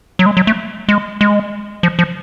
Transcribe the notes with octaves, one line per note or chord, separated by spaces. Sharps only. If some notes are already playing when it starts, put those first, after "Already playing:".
F#3
G#3
F#3
A3
G#3
G#3
F3
F3